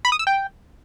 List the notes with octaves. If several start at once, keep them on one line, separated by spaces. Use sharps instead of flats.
B5
D#6
E6
G5